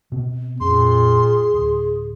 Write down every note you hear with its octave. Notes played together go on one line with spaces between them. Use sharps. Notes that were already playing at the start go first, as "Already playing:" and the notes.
B2 B3 C4
F2 A#2 C#4 G#4 C6
D1